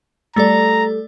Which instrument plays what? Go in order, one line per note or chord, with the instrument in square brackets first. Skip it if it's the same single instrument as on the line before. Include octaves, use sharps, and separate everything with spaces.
[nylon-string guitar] G3 A4 [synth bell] A3 D5 [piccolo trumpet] A#5